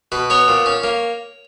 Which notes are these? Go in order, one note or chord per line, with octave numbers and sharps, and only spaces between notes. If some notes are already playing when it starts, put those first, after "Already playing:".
B2 B4
B3 C#5
A#2
C#4
A#3